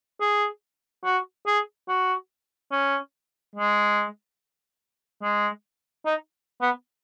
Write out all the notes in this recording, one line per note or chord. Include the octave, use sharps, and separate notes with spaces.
G#4
F#4
G#4
F#4
C#4
G#3
G#3
D#4
B3